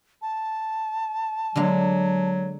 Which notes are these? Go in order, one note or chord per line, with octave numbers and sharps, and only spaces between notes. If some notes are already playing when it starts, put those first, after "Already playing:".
A5
D3 F#3 G#3 A#3